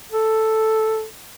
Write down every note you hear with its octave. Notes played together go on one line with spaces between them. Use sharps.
A4